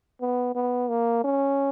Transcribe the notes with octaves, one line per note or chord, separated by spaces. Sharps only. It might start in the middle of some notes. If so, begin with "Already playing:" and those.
B3
B3
A#3
C#4